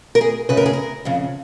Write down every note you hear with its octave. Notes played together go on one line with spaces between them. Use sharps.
A#4
G#4
F#2 C#3 B4
A#4
G#4
A#4
F2 C#3